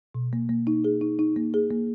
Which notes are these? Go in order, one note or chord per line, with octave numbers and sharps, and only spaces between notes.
B2
A#3
A#3
D#4
G#4
D#4
D#4
A#3
G#4
A#3